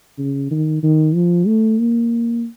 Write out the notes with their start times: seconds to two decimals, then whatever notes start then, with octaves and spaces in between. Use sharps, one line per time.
0.18 C#3
0.51 D#3
0.83 D#3
1.15 F3
1.47 A3
1.79 A#3